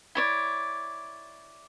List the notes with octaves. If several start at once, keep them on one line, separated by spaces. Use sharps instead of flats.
E4 C#5 D5